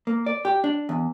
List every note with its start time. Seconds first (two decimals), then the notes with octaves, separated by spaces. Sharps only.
0.07 A#3
0.26 D5
0.45 G4
0.64 D4
0.89 E2